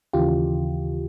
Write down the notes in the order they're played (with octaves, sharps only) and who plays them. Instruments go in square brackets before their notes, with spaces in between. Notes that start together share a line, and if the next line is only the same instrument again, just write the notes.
[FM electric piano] D#2 C#3 E3 F4 G4